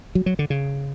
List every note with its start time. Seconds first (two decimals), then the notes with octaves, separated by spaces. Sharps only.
0.15 F#3
0.26 F#3
0.39 D3
0.50 C#3